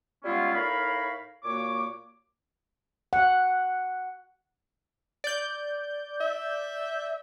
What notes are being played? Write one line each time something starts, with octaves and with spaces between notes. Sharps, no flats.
G3 G#3 B3 C#4 E4 F4
A2 D#4 A#4 C#5 F5 B5
A#2 A#3 F#4 C#5 D6
F#5
D5 G6
E5